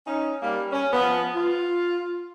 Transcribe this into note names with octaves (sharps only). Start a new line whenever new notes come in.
C#4 D#4
G3 A#3
C#4
F3 B3
F4